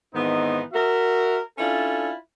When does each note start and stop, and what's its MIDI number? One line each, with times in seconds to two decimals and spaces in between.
0.15 0.62 44
0.15 0.62 51
0.15 0.62 52
0.15 0.62 59
0.15 0.62 60
0.15 0.62 63
0.73 1.39 66
0.73 1.39 70
0.73 1.39 76
1.58 2.12 61
1.58 2.12 62
1.58 2.12 64
1.58 2.12 65
1.58 2.12 69